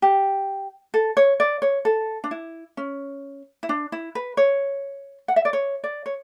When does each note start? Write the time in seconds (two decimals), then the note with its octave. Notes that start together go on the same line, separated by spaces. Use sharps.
0.02 G4
0.94 A4
1.17 C#5
1.40 D5
1.62 C#5
1.85 A4
2.24 D4
2.31 E4
2.77 C#4
3.63 E4
3.69 D4
3.92 E4
4.15 B4
4.37 C#5
5.28 F#5
5.36 E5
5.45 D5
5.53 C#5
5.84 D5
6.06 C#5